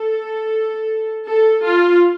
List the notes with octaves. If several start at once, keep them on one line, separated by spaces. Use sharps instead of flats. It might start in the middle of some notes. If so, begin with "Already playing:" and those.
Already playing: A4
A4
F4